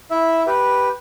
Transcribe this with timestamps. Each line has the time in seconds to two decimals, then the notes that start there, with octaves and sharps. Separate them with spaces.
0.11 E4 E5
0.47 G4 B4